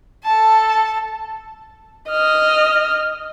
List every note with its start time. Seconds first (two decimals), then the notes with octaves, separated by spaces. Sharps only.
0.24 A4 A5
2.10 D#5 F6